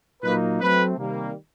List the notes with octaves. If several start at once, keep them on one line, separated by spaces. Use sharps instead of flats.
A#2 F#3 A#3 D#4 B4
F#3 A3 C4 B4
C3 D#3 G3 A#3